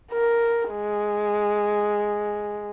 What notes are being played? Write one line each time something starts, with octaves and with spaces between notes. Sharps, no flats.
A#4
G#3